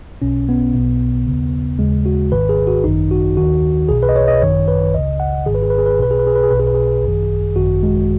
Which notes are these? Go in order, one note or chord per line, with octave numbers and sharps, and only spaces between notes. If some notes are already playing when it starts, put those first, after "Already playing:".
B1 B2 C#4
B3
B1 B2
C#3
D#2
D#2 C#3 G#3
F#4
G#1 G#2 D#3 B4
G#4
F#4
G#1 F#2 D#3 D#4
F#4
D#2 D#3 F#4
B1 B2 G#4
B4
D#5
C#5
D#5
G#1 F#2 D#3 C#5
B4
C#2 C#3 D#5
F#5
G#1 G#2 D#3 G#4
B4
G#4
B4
G#4
B4
G#4
B1 B2 B4
G#4
B4
G#4
B4
G#4
B1 B2 B4
G#4
B4
G#4
G#1 F#2 D#3
G#1 F#2 D#3 F#4
G#3